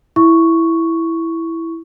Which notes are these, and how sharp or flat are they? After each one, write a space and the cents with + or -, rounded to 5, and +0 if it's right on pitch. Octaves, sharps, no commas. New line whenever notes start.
E4 +0 C#6 +0